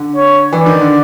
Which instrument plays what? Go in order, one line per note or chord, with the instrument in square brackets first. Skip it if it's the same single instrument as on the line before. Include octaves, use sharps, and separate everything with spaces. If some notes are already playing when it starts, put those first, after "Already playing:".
Already playing: [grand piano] D3
[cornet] C#5
[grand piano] E3 [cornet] D5
[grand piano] D#3
D3